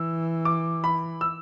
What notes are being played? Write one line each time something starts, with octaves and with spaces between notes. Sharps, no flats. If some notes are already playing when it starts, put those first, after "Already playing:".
Already playing: E3 E6
D6
B5
E6